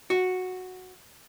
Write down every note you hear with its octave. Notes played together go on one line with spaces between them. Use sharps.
F#4